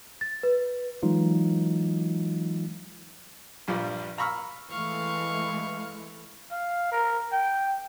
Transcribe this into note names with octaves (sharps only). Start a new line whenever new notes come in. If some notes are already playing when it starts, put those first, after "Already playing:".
A6
B4
E3 F#3 G#3 D#4 F4
A#1 G2 F3 G3
F5 A#5 B5 C#6 E6 F6
E3 G#3 A3 F5 C#6
F5
A#4
G5